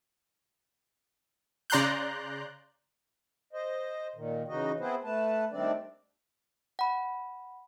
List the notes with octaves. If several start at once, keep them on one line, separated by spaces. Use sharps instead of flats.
C#3 D5 A#5 C6 F#6 G6
C5 D#5
A#2 D#3
C#3 E3 D#4 F#4 D#5
B3 C4 E4 G#4 B4 C5
A3 B4 A5
D#3 G3 A3 C4 D4 D5
F#5 B5